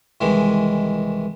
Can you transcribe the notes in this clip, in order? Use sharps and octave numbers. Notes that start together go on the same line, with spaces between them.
C2 D#3 E3 G#3